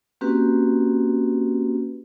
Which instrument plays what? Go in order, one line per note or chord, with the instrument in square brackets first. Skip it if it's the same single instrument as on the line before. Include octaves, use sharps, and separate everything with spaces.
[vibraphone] A#3 C4 C#4 F#4 G4 B4